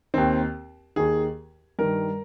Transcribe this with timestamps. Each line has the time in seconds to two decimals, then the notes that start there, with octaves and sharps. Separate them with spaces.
0.14 D#2 D#3 C4
0.96 D#2 D#3 G#4
1.79 G2 D#3 A#4